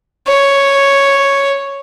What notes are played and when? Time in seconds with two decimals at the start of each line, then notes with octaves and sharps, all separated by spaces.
0.27 C#5